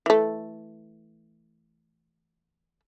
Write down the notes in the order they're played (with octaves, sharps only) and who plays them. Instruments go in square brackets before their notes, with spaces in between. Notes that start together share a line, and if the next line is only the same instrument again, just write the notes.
[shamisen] E3 A3